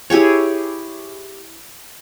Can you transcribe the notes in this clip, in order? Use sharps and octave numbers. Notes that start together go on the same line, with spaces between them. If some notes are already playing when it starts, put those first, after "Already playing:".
E4 G4 G#4 C#5